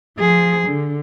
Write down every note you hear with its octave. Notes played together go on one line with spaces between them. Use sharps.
F3 G#4
D3